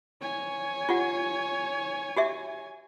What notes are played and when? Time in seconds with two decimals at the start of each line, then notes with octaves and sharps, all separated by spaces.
0.22 C#5 G#5
0.89 F4 G4 F#5
2.17 F#4 G4 E5